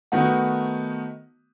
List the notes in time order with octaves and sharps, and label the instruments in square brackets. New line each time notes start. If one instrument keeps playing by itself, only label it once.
[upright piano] D#3 A3 B3 D#4 F#4